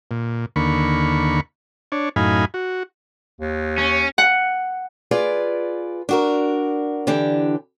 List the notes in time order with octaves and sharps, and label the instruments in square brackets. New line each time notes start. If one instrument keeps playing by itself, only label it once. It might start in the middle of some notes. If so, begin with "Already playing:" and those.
[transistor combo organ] A#2
D#2 D3 A#3 B5 C#6
D4 C#5
F#2 A2 D#4 F5 G#5 B5
F#4
[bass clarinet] D#2
[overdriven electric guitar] C#4
[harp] F#5
[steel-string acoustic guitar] F4 G#4 B4 D5
D4 F#4 A#4
D3 E3 D4 G4